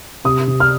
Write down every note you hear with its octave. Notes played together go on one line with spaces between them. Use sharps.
C3 D#6
C3
F6